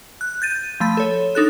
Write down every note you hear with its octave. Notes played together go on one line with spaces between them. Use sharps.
F#6
G6 A6 D#7
F3 A3 B5 A6
A4 C#5
D4 D#4 A4 F#6